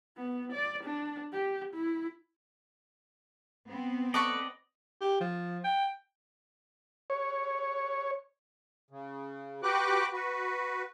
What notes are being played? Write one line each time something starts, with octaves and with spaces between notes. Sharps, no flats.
B3
D5
D4
G4
E4
B3 C4
A4 B4 D5 D#5 C#6
G4
F3
G5
C#5
C#3
F#4 G4 B4 G5 D6 F#6
F#4 B4